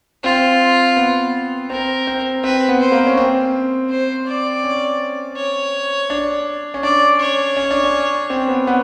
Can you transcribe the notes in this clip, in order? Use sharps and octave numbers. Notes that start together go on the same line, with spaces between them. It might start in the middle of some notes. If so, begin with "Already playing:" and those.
C4 F4
B3
C4 A#4
C4
C4 B4
B3
C5
A#3
C#4
C4
C5
D5
C#4
C#5
D4
C#4
D4 D5
C#5
C#4
D4
C#4
C4
B3
B3